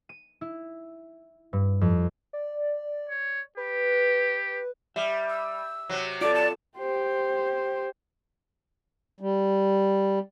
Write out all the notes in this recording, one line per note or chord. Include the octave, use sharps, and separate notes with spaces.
D#7
E4
G2
F2
D5
C#5
G4 B4
G3 E5
E6
C3 F#3
F4 A4 D5 D6
A5
G4 C5
G3